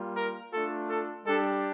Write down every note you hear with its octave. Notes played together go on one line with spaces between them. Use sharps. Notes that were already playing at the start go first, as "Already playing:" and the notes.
Already playing: G3 A#3 F4
A#4
A3 D4 F4 A4
A4
G3 D4 G4 A4